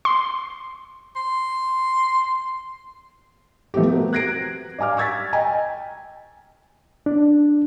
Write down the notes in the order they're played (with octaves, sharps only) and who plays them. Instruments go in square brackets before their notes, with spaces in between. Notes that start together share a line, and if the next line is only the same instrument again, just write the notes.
[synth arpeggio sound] C6
[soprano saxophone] C6
[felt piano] F3 A3 B3 C4 G4
B3 C4 F#4 A#4
F#6 G#6 A#6 C7 D7
D5 F5 G#5 D6 F6
C#6 E6 G#6 A6 B6
D#5 G5 G#5 A#5
[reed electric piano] D4